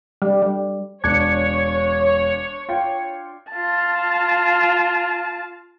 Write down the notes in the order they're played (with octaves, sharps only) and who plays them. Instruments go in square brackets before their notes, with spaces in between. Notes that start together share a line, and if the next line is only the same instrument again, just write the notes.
[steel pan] G3
G3
[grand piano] E1 [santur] D4 [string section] C#5 [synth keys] G#6 C#7
[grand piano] F4 G5
[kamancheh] F4 A5